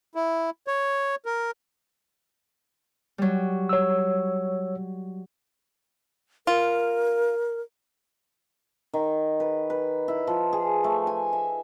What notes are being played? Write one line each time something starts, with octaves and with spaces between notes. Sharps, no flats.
E4
C#5
A#4
F#3 G3
C#5 E6
F4 A#4
D#3
B4
B4
E4
F3
G#4
A3
G#5
E5